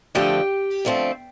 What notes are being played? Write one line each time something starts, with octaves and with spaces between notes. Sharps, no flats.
D3 F3 A3 C4 G4 G5
D3 F3 A3 C4